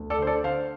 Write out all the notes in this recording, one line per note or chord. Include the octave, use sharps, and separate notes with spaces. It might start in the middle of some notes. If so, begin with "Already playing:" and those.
Already playing: D2
A4 D5
D3 C5
A4 D5
D3 C5 F5